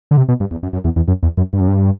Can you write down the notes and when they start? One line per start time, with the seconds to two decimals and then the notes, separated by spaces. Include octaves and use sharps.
0.11 D3
0.17 C3
0.28 B2
0.40 G2
0.51 E2
0.63 F#2
0.73 F#2
0.84 E2
0.96 E2
1.08 F#2
1.23 E2
1.37 F#2
1.53 G2
1.60 F#2
1.68 G2